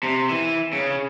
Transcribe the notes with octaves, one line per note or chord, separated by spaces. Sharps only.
C3
E3
C#3